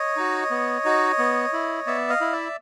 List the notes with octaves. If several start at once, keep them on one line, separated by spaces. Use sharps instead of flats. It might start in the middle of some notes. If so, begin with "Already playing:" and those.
Already playing: C#5 D#5
D#4 F#4
B3
D#4 F#4
B3
E4
B3 D5 E5
D#5 F5
E4
D5 E5